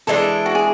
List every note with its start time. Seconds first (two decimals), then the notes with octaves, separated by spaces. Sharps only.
0.07 E3 G#3 D4 A4
0.46 F#4
0.55 G#4